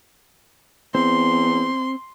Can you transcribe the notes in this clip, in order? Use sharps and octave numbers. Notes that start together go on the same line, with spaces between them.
E2 C4 C6